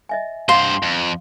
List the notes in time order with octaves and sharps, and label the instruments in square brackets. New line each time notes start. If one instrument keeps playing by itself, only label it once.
[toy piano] D#5 E5 G#5
[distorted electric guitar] G2 C5 [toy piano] F5 F#5 [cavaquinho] C6
[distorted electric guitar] F2